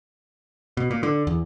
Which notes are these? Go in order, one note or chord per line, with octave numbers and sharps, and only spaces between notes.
B2
A#2
D3
E2